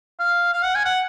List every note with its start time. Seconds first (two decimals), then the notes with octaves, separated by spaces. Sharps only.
0.20 F5
0.53 F5
0.64 F#5
0.75 G#5
0.85 F#5